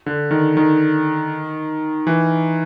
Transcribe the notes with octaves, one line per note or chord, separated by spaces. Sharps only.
D3
D#3
D#3
E3